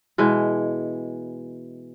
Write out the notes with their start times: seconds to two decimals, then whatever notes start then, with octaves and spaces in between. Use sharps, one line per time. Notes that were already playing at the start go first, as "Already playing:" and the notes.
0.18 B2 E3 G#3